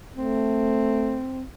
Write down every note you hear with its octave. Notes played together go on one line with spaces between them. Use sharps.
A3 C4